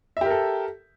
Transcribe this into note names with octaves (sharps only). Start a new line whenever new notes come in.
G4 A4 A#4 E5